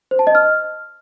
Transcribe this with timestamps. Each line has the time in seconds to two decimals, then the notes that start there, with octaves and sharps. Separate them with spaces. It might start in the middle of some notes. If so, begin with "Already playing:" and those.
0.11 C5
0.19 A5
0.27 D#5
0.35 F6